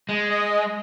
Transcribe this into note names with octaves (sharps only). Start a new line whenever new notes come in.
G#3
D#5